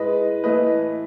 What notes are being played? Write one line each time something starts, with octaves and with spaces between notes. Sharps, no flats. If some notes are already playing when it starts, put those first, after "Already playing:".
Already playing: A2 G#3 B4 D#5
A2 E3 A3 B4 D#5